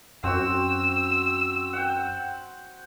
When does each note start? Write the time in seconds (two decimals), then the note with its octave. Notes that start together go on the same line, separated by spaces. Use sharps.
0.24 F#2 C4 F#4 E6
1.73 F#5 G5